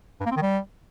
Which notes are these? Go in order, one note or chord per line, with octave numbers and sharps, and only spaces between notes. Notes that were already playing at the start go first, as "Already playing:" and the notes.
G2
A#3
C4
D#3
G3